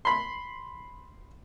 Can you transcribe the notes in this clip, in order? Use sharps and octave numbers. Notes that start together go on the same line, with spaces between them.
B5 C6